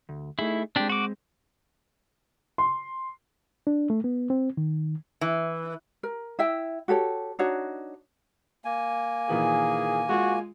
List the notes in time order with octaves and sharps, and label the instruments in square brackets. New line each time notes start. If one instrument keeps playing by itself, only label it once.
[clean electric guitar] D2
[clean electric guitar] A3 D#4 G#4 [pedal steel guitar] E4
[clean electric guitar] G#3 C4 [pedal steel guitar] D4 G4
[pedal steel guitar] F#4 D6
[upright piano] C6
[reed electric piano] D4
A3
B3
C4
D#3
[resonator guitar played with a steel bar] E3
[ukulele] A#4
E4 E5 G5
F#4 G4 A4 C#5
D4 D#4 F#4 C#5
[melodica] A#3 G#5
[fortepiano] A#2 D#3 E3 [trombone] G#4
[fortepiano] G#3 F4 [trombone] F#4